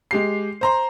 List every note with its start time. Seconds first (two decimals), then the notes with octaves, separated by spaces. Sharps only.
0.11 G#3 G4 C7
0.61 C5 A#5 C6